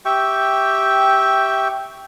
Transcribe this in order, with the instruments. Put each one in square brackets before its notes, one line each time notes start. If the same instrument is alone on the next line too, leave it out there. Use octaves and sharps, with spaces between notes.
[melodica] G4 E5 G5 C#6